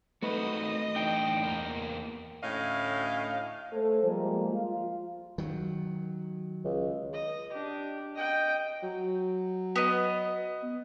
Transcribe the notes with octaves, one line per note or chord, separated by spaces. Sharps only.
A3 C4 D#4 F#4 B4 D#5
E3 D4 D#4 G5
E2 A#3 A#4
D2 A2 C#4 D#5 F5
A3 A4 C5
F3 G3 G#3 A#3
F4
D#3 F#3
C#2
D#5
D4 G4
D#5 G5
F#3
B3 D#5